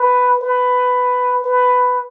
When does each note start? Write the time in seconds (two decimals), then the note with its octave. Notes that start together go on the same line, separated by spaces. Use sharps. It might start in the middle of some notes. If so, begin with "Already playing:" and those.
Already playing: B4
0.41 B4
1.44 B4